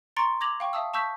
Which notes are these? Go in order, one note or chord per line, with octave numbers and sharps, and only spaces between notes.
A#5 C6 C#6 A6 C#7 D7
D6 G#6 A#6 F7 F#7
F5 G5 C#6
E5 F5 A5 D#6 E6
A5 C#6 E6 G6 B6